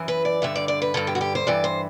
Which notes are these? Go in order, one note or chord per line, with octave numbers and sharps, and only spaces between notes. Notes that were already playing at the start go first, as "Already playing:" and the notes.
Already playing: F#2 E3
B4
D5
G2 D3 E5
D5
D5
B4
G2 D3 A4
G4
F#4
G4
C5
G2 E3 D5
C5